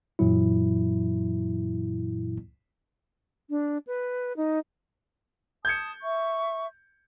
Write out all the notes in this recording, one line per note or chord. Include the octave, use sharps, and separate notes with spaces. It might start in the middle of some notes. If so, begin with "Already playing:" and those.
F#2 A#2 E3 F#3 E4
D4
B4
D#4
A5 D#6 G6 G#6 C#7
E5 C#6